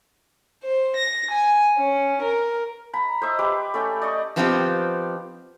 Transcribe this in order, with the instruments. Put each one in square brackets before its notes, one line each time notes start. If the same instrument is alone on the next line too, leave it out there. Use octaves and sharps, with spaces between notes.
[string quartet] C5
A#6
G#5
C#4
A#4
[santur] A#5 B5
C5 D#5 E5
G4 B4 D6
A3 C#4 G5
D5 D#5 C#6
[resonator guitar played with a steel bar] F3 B3 C4 D#4 F4 G4